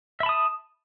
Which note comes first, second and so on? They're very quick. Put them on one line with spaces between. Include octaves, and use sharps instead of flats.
E5 B5 A5 D#6